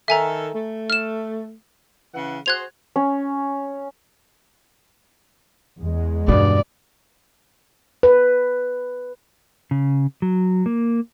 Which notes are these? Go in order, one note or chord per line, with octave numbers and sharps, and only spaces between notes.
D#3 A4 E5 G#5 A#5
A3
F6 E7
C#3 E3 F#5
F#4 G#4 C5 F#6 G#6 F7
C#4
E2 G#3
G2 B2 D4 D5
B4
C#3
F#3
A#3